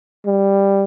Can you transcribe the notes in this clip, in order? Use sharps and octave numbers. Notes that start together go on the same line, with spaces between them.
G3